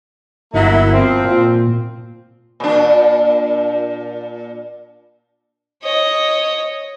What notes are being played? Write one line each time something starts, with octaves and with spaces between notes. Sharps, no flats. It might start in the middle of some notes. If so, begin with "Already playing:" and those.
G1 F#3 A#3 E4
F3 C4
A#2
A#2 D4
C#5 D#5